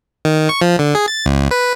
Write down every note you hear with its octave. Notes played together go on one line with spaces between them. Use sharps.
D#3
C#6
F3
D3
G#4
A6
C#2
B4